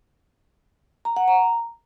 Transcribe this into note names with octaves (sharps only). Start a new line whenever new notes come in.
A#5
F#5
A#5